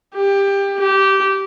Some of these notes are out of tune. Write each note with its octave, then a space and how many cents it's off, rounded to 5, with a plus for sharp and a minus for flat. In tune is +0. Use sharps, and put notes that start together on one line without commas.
G4 +20
G4 -15